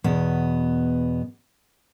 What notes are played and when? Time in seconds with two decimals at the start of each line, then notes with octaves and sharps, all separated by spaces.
0.04 E2 B2 B3